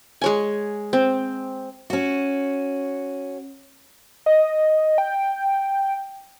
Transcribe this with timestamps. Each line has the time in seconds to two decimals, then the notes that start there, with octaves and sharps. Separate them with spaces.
0.21 G#3 C#5 G#5
0.93 C4
1.90 C#4 F#4
4.26 D#5
4.98 G5